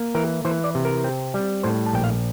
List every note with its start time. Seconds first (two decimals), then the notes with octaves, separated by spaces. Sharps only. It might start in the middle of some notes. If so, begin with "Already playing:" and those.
Already playing: A#3
0.15 E3 A#4
0.45 E3 C5
0.64 D5
0.75 C3
0.85 A#4
1.04 C4
1.34 G3
1.63 A2 C5
1.86 A5
1.93 A#1 G5
2.04 F5